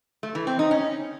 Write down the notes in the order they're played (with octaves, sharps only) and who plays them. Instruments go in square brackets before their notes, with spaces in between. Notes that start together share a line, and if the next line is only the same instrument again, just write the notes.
[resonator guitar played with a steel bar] A3
E3
C4
D#4
C#4